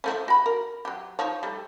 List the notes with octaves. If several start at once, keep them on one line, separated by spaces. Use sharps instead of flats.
F3 A3 C#4
F#4 B5
A#4
F#3 G4
F3 D#4 C#5
G3 A3